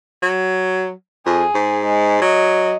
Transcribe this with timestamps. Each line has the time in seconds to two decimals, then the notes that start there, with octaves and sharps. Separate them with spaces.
0.23 F#3
1.26 F2 G#4
1.55 G#2
1.85 G#3
2.22 F#3 D#5